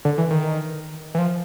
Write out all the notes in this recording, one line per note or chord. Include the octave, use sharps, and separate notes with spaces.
D3
E3
D#3
E3
F3